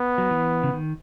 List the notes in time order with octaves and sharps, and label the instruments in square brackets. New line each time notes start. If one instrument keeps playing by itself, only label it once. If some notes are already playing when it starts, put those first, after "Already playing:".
Already playing: [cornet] B3
[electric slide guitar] F#3
E3
C#3
D#3